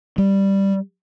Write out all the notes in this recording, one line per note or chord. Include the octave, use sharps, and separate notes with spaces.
G3